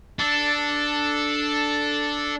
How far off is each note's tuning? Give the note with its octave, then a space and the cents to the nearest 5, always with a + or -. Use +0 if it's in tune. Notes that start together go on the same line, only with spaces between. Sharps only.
D4 +0 A4 +0